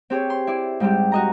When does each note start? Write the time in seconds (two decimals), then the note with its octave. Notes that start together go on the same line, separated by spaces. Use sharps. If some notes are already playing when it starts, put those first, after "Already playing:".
0.10 C4 G4 G#4 C#5
0.30 C6
0.47 E4 D5
0.80 G#2 G3 C4 G4
1.12 F#4 D#5 A#5